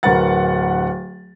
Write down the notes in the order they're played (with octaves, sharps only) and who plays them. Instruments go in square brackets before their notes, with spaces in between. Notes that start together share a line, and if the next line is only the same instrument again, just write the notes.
[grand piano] D1 A#4 B4 F#5 A6